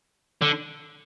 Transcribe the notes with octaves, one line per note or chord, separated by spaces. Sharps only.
D3